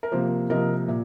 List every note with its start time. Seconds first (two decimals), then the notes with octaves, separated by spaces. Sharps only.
0.03 A#4
0.12 C3 F3 A#3 C5
0.50 C3 F3 A#3 A#4 D#5
0.88 A#2